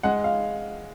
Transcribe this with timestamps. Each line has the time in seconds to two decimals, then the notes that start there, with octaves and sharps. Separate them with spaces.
0.03 G#3 F#5
0.24 F5